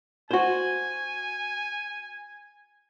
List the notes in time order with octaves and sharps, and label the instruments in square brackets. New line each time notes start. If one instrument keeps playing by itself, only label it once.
[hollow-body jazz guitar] F#4 C5 [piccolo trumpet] G#5